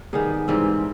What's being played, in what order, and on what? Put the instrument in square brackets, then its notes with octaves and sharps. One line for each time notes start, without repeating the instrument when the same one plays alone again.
[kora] D#3 G3 B3 [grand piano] G#4
[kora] G#2 E3 G3 C4